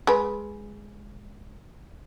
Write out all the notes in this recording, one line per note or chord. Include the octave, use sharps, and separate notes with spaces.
G#3 B4